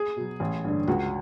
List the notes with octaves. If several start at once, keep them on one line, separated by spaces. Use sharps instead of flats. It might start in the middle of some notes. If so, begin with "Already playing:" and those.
Already playing: G#4
B2 F#3
A1
G2 D3
C#2 F#4